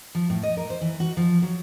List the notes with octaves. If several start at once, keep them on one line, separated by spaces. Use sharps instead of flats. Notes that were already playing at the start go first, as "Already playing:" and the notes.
F3
A2
D#5
A#4
C5
E3
F#4
F3
F#3